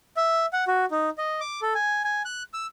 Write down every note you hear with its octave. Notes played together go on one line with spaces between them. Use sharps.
E5
F#5
F#4
D#4
D#5
D6
A4
G#5
G#5
F#6
E6